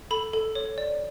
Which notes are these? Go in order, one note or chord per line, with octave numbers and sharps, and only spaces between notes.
A4 B5
A4
C#5
D5